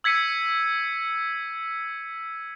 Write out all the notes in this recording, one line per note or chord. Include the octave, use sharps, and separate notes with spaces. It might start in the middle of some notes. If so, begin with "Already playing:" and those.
E6 G#6 B6 C#7 D#7